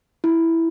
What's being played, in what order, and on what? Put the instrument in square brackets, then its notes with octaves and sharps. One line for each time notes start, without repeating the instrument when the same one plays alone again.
[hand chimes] E4